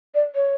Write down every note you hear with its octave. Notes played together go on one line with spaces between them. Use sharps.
D5
C#5